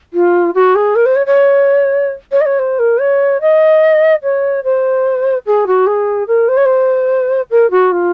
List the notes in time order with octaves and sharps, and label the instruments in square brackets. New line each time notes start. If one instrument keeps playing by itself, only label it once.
[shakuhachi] F4
F#4
G#4
A#4
C5
C#5
C#5
C#5
D#5
C#5
C5
A#4
C#5
D#5
C#5
C5
G#4
F#4
G#4
A#4
C5
C#5
C5
A#4
F#4
F4